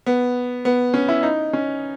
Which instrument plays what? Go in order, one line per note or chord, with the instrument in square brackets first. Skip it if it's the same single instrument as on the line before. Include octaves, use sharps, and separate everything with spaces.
[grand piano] B3
B3
C#4
E4
D#4
C#4